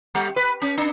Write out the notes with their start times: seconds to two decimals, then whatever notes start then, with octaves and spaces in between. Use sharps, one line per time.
0.15 G3
0.36 B4
0.62 C#4
0.78 D4